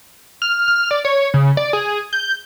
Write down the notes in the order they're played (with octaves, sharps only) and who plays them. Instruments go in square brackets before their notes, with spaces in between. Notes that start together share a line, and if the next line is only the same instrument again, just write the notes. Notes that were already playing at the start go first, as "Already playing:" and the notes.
[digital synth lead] F6
F6
D5
C#5
C#3
D5
G#4
G6